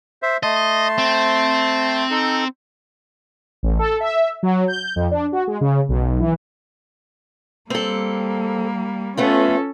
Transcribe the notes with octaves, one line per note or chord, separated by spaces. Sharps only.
C5 E5
A3 D#5 A5 C6
C4
D#4 A4
A1
A4
E5
F#3
G6
F2
D4
F#4
G#3
C#3
B1
E3
G3 A#3 C4 A4
A3 B3 C#4 F4 A4